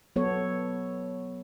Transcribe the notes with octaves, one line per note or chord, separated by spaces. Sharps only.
F#3 B3 A4 C#5